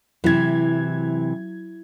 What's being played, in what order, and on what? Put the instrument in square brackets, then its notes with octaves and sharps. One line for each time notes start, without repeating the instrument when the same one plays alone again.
[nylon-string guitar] C3 E3 [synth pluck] F#3 E4 G#6